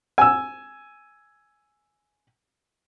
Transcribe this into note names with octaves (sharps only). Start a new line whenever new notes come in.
G#5 E6